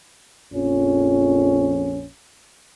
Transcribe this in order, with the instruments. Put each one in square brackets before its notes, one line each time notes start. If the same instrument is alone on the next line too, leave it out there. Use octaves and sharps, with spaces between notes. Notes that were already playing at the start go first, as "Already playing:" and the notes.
[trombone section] A#1 F2 C#4